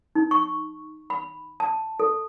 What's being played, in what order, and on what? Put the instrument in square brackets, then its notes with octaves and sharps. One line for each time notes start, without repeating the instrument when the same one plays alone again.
[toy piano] D#4
C#6
B5
A5
A4